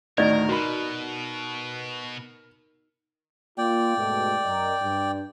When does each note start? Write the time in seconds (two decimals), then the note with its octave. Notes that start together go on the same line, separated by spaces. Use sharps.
0.18 D2 A2 D#3 D#4 A#4 D5 D#5
0.49 B2 F#4 A#4 B5
3.58 A#3 F4 D5 G5
3.97 G#2 B2 A3
4.45 F#2 A#4 D#5
4.82 G2